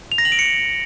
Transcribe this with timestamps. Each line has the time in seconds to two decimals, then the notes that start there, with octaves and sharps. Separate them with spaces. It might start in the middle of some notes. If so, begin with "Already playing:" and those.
0.12 F7
0.18 A#6
0.25 F#7
0.32 D7
0.39 C#7